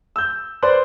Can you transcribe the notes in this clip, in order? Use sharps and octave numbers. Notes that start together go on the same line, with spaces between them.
E6 G6
B4 C5 D5 C6 F#6